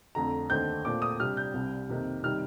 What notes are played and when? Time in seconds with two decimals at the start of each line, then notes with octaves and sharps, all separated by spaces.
0.15 F2 D3 A3 A#5
0.50 D#2 D3 A3 C4 D#4 G6
0.85 A#2 A3 C4 D6
1.02 D#6
1.20 C3 G3 D4 F6
1.37 G6
1.54 C2 C3 G3
1.89 F2 C3 D#3 A#3 D#4
2.23 C3 D#3 G3 C4 D#4 F6